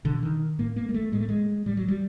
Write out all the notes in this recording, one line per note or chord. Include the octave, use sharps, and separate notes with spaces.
B2 D3
D#3
A2 A#3
A#3
G#3
A3
A2 G#3
A3
G#3
A2 G3
F#3
G3